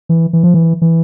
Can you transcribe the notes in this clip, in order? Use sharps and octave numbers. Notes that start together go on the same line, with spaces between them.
E3
E3
F3
E3
E3